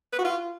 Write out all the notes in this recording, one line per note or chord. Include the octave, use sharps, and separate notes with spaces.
B4
F#4
F4